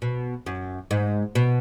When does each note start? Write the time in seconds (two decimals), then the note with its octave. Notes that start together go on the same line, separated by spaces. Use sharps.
0.02 B2
0.46 F#2
0.91 G#2
1.35 B2